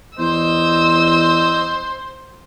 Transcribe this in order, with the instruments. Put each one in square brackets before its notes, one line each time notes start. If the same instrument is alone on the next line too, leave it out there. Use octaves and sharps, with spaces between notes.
[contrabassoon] E2 [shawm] C5 [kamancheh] D#5 E6